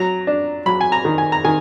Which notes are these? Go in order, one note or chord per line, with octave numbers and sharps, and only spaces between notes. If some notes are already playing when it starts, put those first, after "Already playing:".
Already playing: F#3 A#5
D4
F#3 B5
G#5
A#5
D#3
G#5
A#5
D#3 G#5